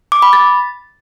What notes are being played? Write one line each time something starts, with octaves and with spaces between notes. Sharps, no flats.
D6
B5
A6